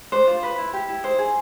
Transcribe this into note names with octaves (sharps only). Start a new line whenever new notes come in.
D4 C5
F4
B4
E4
G4
E4
D#4 C5
G#4